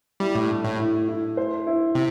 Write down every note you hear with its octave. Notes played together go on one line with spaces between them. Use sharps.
G3 E4
A2
A3
A2
E4
E4
C5
E4
C3